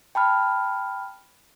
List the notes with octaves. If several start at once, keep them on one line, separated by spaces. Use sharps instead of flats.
G5 A5 B5 F6